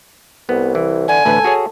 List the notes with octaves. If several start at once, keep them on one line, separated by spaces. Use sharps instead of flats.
C2 B3
E3
D3 G#5
A1 D2 A4 B4
F#4 G#4 C#5